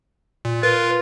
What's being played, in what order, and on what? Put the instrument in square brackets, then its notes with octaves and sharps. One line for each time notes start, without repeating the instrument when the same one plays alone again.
[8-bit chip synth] A#2
[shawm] F4 [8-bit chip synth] A#4 B4